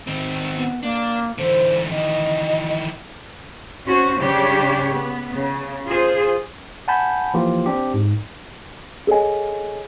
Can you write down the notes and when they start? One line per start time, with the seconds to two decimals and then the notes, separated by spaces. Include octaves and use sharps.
0.07 D#3 C4
0.55 B3
0.83 A#3 D4
1.38 D3 E3 C5
1.91 D#3 E3 D#5
3.87 C#4 F#4 C5
4.19 C#3 G3 D4 G4 C#5
4.93 B3
5.33 C#3
5.89 F4 G#4 C5
6.88 F#5 G#5 A5 B5 G6
7.34 E3 F3 A#3 F4 G4
7.66 C4 D4 G4
7.94 G#2
9.07 G#4 A4 C#5 D#5 G#5